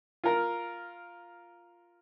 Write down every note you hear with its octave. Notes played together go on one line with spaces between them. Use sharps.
F4 A#4